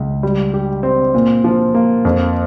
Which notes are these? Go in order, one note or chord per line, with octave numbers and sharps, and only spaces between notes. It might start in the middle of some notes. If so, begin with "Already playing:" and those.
Already playing: C#2
G3
G4
C4
A#2
F3
A#3
F2